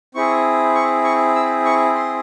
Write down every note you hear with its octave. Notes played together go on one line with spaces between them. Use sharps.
C4 E4 G#4 C#6
C#6
C#6
E6
C#6
C6